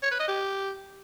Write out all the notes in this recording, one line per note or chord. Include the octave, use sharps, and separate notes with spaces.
C#5
B4
D#5
G4